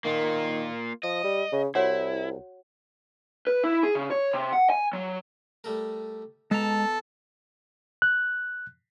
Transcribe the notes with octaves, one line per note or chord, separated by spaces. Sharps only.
D#3 A#3 F4
F3 D#5
G3
C#3
C2 E4 F#4 C#5 F#5
B4
E4
G#4
C#3
C#5
C3
F#5
G#5
F#3
G3 A3 A#4
B2 G#3 A4 A5 A#5
F#6